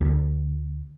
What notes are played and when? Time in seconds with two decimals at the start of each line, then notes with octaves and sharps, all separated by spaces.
0.01 D2